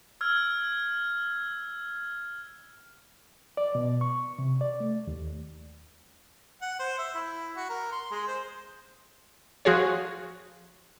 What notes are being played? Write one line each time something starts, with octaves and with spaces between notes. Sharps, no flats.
E6 F6 G#6
D5
B2
C#6
C3
D5
A3
D#2
F#5
C5
E5
E4
F#4
A#4
C6
G#3
C5
F3 F#4 G#4 C#5